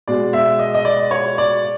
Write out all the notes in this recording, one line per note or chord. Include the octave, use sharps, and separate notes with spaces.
B2 G#3 D5
E5
D#5
D#5
D5
C#5
D5